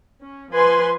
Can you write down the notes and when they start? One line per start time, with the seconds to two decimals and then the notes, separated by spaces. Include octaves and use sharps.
0.22 C#4
0.53 F3 B4 G#5 C6